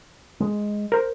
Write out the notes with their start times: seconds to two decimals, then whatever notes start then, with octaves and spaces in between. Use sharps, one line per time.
0.40 G#3
0.92 A#4 C5